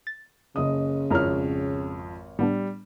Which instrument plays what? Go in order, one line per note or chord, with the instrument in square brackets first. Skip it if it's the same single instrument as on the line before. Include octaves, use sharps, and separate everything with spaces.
[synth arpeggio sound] A6
[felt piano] F#1 D#5 D#6 [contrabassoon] C#3
[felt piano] G#1 C#5 F6 [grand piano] F2 [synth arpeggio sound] E4 A#4 A#5
[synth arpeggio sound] A2 B3 D4 [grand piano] G3